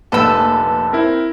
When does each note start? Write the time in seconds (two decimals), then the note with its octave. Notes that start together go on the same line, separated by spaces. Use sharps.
0.12 F1 A#1 A4 B4 E6
0.93 C4 E4 A#4